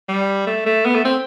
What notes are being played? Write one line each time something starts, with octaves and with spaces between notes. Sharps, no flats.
G3
A3
A3
B3
A3
C4